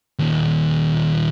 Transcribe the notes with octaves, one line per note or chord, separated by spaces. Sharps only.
D#2 A#2